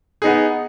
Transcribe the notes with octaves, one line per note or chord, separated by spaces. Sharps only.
B3 D#4 G#4